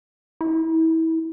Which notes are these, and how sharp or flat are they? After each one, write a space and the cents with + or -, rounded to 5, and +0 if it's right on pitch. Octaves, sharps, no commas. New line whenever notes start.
E4 -30